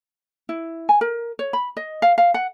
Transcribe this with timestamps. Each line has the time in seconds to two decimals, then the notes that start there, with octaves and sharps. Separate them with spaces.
0.49 E4
0.89 G#5
1.01 A#4
1.39 C#5
1.53 B5
1.77 D#5
2.02 F5
2.18 F5
2.34 F#5